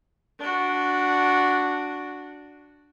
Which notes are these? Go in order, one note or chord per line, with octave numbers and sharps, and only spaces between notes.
D4 F#4